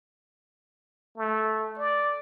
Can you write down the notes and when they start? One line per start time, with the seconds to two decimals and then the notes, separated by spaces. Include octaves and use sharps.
1.18 A3
1.79 D5